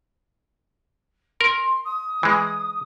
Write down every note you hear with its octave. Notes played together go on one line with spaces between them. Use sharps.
A#4 C6
D#6
E3 G#3